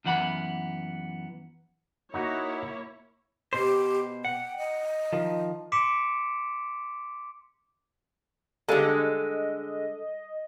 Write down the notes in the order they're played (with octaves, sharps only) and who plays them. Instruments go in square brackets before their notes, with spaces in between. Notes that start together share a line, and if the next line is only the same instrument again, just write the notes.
[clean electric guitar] F#2 E3 B3 F#5 B5
[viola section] A#3 E4 C#5 [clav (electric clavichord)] D#4 F#4
[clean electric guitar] B2 C5 [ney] G4
[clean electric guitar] F#5 [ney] G5
[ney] D#5
[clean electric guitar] D#3 F3
[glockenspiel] C6 D6 B6 C#7 D7 E7
[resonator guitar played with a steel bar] D3 G#3 [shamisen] G3 D5 F5 [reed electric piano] A4 [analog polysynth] D#5